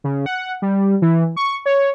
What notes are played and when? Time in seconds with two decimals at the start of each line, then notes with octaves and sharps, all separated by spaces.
0.04 C#3
0.26 F#5
0.62 G3
1.02 E3
1.37 C#6
1.66 C#5